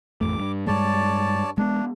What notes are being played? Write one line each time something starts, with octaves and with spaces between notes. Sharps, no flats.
A1 F2 A3 D6
G2
G2 G3 G#3 C#5 D5 A5
G#3 A3 B3 D4